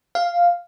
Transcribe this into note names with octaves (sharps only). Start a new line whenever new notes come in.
F5